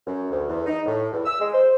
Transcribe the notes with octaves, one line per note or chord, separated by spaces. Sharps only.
F#2
D2
E2
D#4
A2
E2
E6
G#3
C5